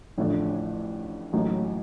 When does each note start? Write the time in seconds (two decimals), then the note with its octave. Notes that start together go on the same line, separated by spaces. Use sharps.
0.18 A1 A2 F3 A3 D4
1.33 A1 A2 F#3 A#3 D#4